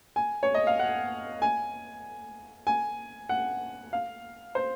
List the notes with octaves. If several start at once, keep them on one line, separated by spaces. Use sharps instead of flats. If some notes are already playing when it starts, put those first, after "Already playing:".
G#5
C#5
D#5
F5
F#5
G#5
G#5
F#5
F5
C5